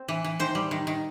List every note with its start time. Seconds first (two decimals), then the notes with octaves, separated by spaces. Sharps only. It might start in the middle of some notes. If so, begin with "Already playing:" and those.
Already playing: C4
0.08 E3
0.24 E3
0.39 D#3 C5
0.55 G3
0.71 D#3
0.87 D#3